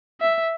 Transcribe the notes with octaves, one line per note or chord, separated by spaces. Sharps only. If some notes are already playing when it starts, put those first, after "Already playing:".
E5